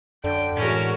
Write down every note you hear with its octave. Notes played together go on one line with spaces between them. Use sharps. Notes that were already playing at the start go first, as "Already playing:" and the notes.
F#2 D3 G5
A2 E3 G#3 C#4 F#4 A#4